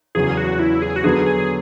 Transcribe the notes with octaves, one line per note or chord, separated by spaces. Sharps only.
E2 C#3 F#3 G#4
F#4
E4
G#4
F#4
D3 F#3 B3 G#4
G#4